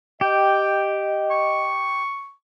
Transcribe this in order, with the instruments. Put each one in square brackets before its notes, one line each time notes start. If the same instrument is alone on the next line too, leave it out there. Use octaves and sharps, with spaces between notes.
[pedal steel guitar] G4 [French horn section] D#5 [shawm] G5
[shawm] C#6